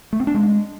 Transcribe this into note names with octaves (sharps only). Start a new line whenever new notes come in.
A3
C4
D4
G#3